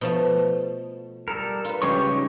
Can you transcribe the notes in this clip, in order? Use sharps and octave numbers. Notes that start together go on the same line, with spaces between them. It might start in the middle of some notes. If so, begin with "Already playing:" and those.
B2 F3 A3
G3 A4 A#4
F4 B4
C#3 G3 G#3 G4 C#5 C#6
D#4 G4